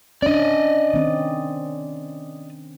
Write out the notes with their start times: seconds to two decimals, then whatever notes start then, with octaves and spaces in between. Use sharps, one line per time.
0.22 C#4 D4 D5 D#5
0.94 D#3 C4 C#4